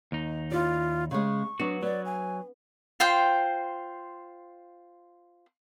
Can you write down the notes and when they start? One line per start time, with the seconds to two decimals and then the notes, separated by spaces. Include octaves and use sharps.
0.12 D#2 D#4
0.52 E4 F4 D5
1.11 C#3 G#3 C#6
1.60 F#3 B3 D4 F#4
1.83 F#3 B3 D5
2.05 G#5
3.00 F4 C5 G5